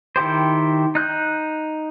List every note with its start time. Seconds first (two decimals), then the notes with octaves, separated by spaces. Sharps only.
0.16 D#3 E4 G4 C5
0.95 D#4 F#6 G6